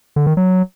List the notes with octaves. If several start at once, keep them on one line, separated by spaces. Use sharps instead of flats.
D3
D#3
F#3